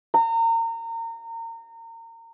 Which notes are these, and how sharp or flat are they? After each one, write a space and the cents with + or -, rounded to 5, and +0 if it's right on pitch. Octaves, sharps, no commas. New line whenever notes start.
A#5 -30